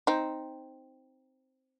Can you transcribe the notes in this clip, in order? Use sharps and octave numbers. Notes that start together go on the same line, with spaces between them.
C4 D#4